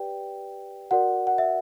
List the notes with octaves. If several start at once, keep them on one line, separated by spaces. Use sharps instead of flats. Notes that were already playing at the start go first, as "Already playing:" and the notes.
Already playing: G4 B4 D5 G5
F#4 A#4 D5 F#5
F#5
E5